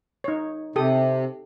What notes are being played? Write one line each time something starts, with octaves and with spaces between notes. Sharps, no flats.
D#4 C#5
C3 G4 A4 D#6